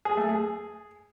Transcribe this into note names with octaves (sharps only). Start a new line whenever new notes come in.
G#4
A3
G#4